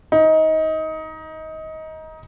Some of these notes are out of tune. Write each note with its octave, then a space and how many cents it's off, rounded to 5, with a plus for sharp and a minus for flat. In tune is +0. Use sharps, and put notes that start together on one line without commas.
D#4 +20